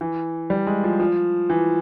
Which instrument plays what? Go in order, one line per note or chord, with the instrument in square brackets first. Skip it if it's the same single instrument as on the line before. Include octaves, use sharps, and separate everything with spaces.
[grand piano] E3
G3
G#3
F3
F3
E3